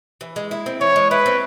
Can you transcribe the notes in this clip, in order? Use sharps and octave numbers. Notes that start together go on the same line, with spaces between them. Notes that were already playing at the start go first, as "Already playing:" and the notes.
E3
G#3
E4
C4
E3 C#5
G#3
E4 B4
C4